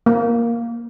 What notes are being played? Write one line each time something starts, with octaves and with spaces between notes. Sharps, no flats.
A#3